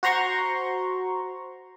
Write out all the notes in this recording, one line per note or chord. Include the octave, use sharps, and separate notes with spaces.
F#4 C5 A#5 C6 C#6